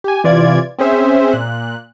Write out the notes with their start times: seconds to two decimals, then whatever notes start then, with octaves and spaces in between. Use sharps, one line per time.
0.04 G4 G#5
0.24 C3 E3 F4 D5 G#6
0.79 C4 C#4 G#4 C5 E5
1.32 A#2 F#6